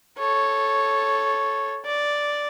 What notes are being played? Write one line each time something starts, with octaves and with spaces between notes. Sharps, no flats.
A4 C#5
D5